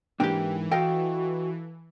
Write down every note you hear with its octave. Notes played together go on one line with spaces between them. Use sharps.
G#2 E3 A#3 D4 G4 G5
F#4 A4 D#5 F5 G5